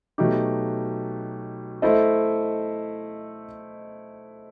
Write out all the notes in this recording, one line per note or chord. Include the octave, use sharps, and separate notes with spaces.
B2 F#3 A3 D#4 G4
A3 E4 A4 C5 D#5